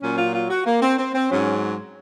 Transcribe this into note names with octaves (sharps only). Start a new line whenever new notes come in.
A#2 F#3 C#4
F4
F4
F#4
A#3
C4
C4
C4
G#2 F#3 C#4